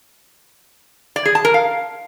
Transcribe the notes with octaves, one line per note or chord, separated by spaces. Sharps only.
D5
G#4
A5
A#4
F5